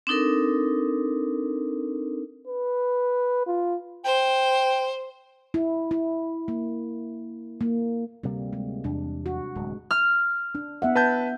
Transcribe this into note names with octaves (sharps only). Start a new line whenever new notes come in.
C4 D4 D#4 A4 A#4
B4
F4
C5 G5
E4
E4
A#3
A#3
D2 C3 G3 A#3
G#3
E2 C3 D4
F#4
D1 G#3
F6
D4
B3 E5 F#5
B4 A5 G6